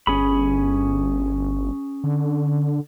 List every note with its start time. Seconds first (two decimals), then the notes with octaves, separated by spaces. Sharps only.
0.07 G1 C#4 G#4 B5
2.04 D3